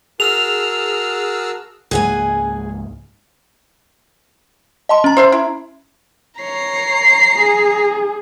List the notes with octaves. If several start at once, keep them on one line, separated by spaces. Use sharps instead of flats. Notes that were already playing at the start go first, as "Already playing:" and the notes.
F#4 G#4 A#4 A5 E6 F6 F7
C#2 G#2 A#3 G#4 F#5 G#5
D#5 A5 C6
C#4 A#5
C5 E5 C6
E4
C#5 A#5 C7
G#4